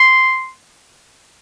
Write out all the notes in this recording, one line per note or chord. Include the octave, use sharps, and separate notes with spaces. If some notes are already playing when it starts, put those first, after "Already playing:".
Already playing: C6